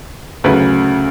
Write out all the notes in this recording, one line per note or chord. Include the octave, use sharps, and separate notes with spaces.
D2 C#3 F#3 B4